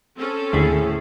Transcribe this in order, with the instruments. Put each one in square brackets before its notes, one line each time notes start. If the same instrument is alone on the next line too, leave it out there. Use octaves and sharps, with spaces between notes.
[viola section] C4 C#4 A4
[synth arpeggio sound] D#2 D3 B5 [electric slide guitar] A2 [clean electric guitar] G#4